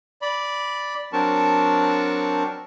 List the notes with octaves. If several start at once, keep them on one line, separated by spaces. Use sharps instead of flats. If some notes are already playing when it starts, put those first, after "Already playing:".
D5 B5
F#3 C4 D4 A#4 A5 C#6